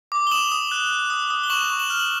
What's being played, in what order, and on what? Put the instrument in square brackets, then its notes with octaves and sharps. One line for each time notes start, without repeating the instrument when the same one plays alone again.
[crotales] D6
G7
D#6 E7 F#7
D#6
F#6
F#6
D#6
D#6
G7
C#6 E7 F#7
C#6
E7 F#7
F6
F#7